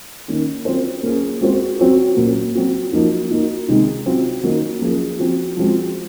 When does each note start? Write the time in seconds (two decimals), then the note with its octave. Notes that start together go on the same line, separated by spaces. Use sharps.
0.28 D#3 A#3 C#4
0.65 F#3 C4 F4 C5
1.03 A#3 C#4 G#4
1.41 G#3 C4 F#4 C5
1.79 F#3 C4 F#4 C#5
2.16 A#2 F#3 A#3 C#4
2.55 F#3 C4 F#4
2.92 F3 A#3 D#4 F#4
3.30 A#3 D#4 F#4
3.68 C3 D#3 G#3 D#4 G#4
4.06 F#3 C4 F4
4.44 D#3 F#3 A#3 D#4
4.82 F3 A#3 C#4 F4 G#4
5.19 F3 C4 F#4
5.57 F3 G#3 C4 F#4